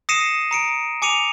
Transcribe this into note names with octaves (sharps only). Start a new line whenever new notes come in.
D#6 A#6 C7 C#7 D#7 E7
A#5 C#7 D7
G#5 D6 C#7 D#7 F7